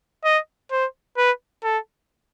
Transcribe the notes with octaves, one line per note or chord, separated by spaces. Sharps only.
D#5
C5
B4
A4